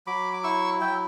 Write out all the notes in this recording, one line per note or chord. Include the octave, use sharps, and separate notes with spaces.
F#3 B5 D6
D6
E4 C#6 E6
F#3 E5 G5